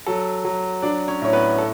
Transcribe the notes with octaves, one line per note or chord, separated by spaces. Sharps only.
F#3 A4
F#3
F#3 D4 D5
C#4 C#5
A2 C#5
B3 B4
A4